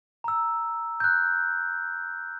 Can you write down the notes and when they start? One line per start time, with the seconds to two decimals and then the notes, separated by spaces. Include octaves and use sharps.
0.24 A#5 E6
1.00 F#6 G6